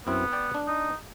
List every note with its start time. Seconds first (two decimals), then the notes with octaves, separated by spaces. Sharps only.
0.07 F#2 B3 C4 E4
0.32 D5 G5
0.54 D4
0.68 D#4